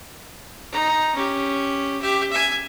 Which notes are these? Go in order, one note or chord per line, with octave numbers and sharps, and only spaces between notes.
D#4 A#5
C#4 G4
G4 E5
E5 G#5